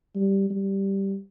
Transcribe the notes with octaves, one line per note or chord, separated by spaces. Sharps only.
G3
G3